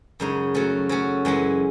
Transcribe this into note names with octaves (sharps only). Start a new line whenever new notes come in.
F#2 C#3 G#3 D#4
F#3 A3 C#4
F#3 A3 C#4
F#2 E3 G#3 C#4